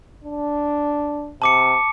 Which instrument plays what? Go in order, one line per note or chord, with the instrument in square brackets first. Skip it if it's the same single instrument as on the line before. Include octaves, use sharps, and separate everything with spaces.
[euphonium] D4
[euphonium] C3 [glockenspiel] A5 D6 C#7